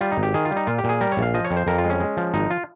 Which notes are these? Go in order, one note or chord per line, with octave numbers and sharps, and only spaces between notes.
G3 F4
D#4
G#1
G4
D#3 G#4
F4
G3
D#4
A#2 F4
G4
A#2
G#4
G3 A#4
C#5
A#1
F5
F3 D#5
C#5
F2
C5
F2 A#4
F4
G#3
C#4
G#3
F3
G#1 D#4
F4